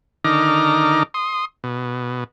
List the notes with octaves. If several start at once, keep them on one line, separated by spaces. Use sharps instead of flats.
D3 D#3 D#4 A#5 D6 F6
C6 D#6
B2